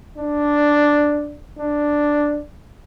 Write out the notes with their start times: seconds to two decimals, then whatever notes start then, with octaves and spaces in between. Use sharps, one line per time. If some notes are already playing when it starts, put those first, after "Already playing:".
0.18 D4
1.59 D4